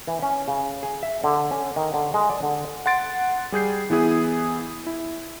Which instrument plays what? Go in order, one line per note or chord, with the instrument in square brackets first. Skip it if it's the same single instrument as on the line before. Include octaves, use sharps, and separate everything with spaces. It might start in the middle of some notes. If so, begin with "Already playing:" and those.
[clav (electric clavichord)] E3
C#4
C#3
G#4
E5
D3
C#4
D#3
D3
G#3
D5
D3
[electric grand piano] F#5 C6 A6 D7
G3 G#4 G6 C7
E3 B3 E4 G#4 D#6
E4